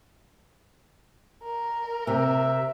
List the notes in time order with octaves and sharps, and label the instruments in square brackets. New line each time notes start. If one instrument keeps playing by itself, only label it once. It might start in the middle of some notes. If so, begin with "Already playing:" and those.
[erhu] A#4
[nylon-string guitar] C3 [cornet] E5